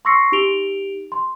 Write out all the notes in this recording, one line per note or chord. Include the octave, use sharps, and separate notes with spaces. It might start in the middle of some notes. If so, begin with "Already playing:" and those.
C6 C#6 E6 A#6 C7 C#7
D#4 G4 D7 F7 G7
C6